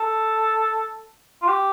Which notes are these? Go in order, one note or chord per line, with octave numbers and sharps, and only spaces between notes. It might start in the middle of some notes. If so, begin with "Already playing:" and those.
Already playing: A4
F4
G4